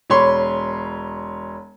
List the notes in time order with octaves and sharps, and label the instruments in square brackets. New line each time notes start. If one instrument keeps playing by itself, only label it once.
[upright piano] E1 C#5 B5 C6